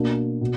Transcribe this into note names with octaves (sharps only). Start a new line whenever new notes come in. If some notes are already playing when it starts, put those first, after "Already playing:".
Already playing: B2 A#3 D4
B2